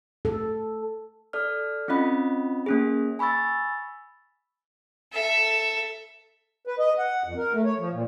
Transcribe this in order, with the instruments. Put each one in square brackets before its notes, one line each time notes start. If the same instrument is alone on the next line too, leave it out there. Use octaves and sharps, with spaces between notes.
[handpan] A4
[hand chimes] A4 D5 F6
C4 C#4 F4 D#5 B5
A#3 C#4 G#4
G#5 B5 C#6 E6 A6
[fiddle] A4 E5
[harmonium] B4
D#5
F#5
F2
A#4
A3
C#5
F3
A#2